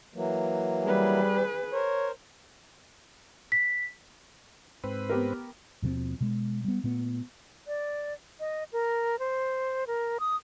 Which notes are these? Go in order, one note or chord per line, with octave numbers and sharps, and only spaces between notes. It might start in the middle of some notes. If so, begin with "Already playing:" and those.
E3 F#3 A#3
G3 G#4 B4
A#4 C5 C#5
B6
G#2 C4 B4
B3 G4 A#4
D#2 B2 F3 C4
B2 G#3
G3 B3
A#2 A3 B3
D5
D#5
A#4
C5
A#4
D#6